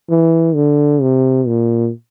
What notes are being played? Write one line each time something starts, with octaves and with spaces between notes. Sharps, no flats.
E3
D3
C3
A#2